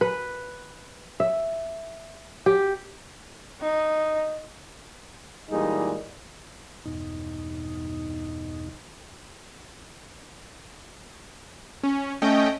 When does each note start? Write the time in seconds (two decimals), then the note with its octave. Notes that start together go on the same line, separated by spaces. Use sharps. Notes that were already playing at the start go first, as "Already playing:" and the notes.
0.01 B4
1.20 E5
2.46 G4
3.62 D#4
5.51 A#2 E3 G3 G#3 D#4 G#4
6.86 E2 G2 B2 D#4
11.83 C#4
12.22 A3 C#4 D#5 G5